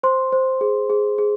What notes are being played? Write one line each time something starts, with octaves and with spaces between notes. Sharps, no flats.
C5 C6
C5
G#4
G#4
G#4